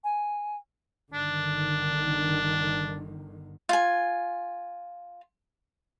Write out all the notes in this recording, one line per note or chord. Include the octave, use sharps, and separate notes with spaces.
G#5
G1 D3 D#3 D4
F4 G#5